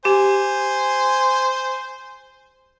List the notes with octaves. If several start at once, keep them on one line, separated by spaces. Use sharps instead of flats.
G4 C5 G#5